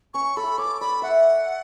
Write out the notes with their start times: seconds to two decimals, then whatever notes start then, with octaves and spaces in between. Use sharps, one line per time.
0.14 C#4 C#6
0.37 A4 B5
0.58 C#5 D6
0.81 D5 B5
1.02 E5 F#5